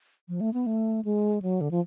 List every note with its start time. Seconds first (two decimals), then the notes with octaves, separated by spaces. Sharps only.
0.28 F3
0.41 A3
0.54 B3
0.66 A3
1.05 G#3
1.42 F#3
1.61 D3
1.71 F3